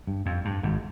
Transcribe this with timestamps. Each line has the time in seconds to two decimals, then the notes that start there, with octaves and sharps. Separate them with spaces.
0.07 G2
0.26 F2
0.45 G2
0.63 G#1 G#2